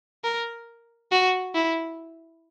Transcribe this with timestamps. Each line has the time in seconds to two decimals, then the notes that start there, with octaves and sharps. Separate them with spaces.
0.24 A#4
1.12 F#4
1.55 E4